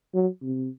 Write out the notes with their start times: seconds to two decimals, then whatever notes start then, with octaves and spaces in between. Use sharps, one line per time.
0.14 F#3
0.42 C3